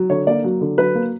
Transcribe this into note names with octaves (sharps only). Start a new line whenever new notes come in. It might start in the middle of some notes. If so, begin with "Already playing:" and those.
Already playing: F#3
D3 C#5
A#3 D5
F#3
D3
F#3 B4
A#3